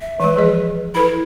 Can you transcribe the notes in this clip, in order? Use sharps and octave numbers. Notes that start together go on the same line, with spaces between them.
E5
E3 G#3 B4
F3 G#4 D#5
E4 A4 B4 B5